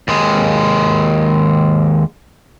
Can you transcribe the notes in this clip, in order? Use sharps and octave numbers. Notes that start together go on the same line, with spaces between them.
D#2 G#3